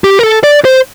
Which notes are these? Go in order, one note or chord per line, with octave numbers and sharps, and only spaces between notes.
G4
A#4
A4
D5
C5